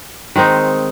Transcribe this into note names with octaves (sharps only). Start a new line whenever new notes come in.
D#3 G#3 C4 D#4